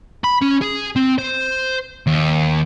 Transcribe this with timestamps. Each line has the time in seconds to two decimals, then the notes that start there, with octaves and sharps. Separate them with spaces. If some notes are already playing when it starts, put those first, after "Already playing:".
0.24 B5
0.41 C#4
0.61 G#4
0.96 C4
1.18 C5
2.07 D#2